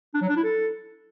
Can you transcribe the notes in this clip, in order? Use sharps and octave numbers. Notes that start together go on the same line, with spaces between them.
D4
F#3
D4
E4
A4